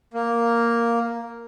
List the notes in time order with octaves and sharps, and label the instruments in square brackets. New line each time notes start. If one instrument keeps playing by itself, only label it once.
[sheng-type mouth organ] A#3